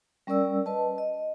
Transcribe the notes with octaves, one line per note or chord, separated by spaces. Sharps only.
G3 C#4 A#4 D5 E6
B4 D#5 A5
D#5